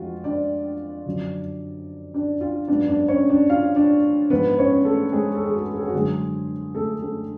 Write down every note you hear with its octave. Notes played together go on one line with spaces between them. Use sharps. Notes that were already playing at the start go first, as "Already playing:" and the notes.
Already playing: F2 G#3 F4 F#4
D4 D5
F#2 D3 F3
D4 D5
F4 F5
G#2 F#3 B3 D4 D5
D4 D5
C#4 C#5
D4 D5
F4 F5
D4 D5
G#2 F3 B3 D4 B4
C#4 C#5
A3 A4
G#3 G#4
A4
G#4
F#4
A4
G#4
F#4
F#2 D3 F#3 G#3 G#4
A3 A4
A3 A4